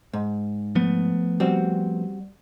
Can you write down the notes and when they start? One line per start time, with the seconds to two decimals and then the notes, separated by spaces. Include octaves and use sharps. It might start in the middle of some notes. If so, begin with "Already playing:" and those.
0.13 G#2
0.75 F3 A3 B3
1.40 G3 C4 F#4